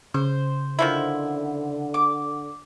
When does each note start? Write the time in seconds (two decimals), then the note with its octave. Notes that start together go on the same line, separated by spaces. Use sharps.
0.14 C#3 C5
0.79 D3 D#3 F3 E4
1.94 D6